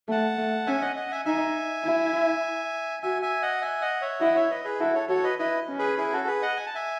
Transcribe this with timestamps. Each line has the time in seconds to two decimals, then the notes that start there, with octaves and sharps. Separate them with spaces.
0.08 A3 F#5 A5
0.38 A3
0.66 C#4 E5 G#5
0.81 D#5 F#5
0.96 D#5 F#5
1.11 E5 G#5
1.25 D#4 E5 G#5
1.84 E4
3.03 F#4 E5 G#5
3.22 E5 G#5
3.42 D#5 F#5
3.62 E5 G#5
3.81 D#5 F#5
4.01 C#5 E5
4.20 E4 D#5 F#5
4.36 C#5 E5
4.51 B4 D#5
4.65 G#4 B4
4.79 E4 F#4 A4
4.94 A4 C#5
5.09 F#4 A4 C#5
5.24 B4 D#5
5.39 E4 B4 D#5
5.68 C#4
5.79 G#4 B4
5.98 E4 G#4
6.13 F#4 A4
6.27 G#4 B4
6.42 D#5 F#5
6.56 G#5
6.66 A5
6.75 E5 G#5